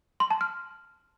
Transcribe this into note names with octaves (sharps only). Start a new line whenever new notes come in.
C6
A5
F6